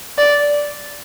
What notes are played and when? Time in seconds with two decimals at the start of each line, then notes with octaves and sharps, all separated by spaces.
0.18 D5